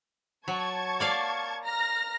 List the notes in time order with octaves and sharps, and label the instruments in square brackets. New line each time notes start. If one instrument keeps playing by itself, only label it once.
[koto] F#3 [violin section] A5 C#6 G#6
[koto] A#3 D5 F5
[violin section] A#5 F6 A#6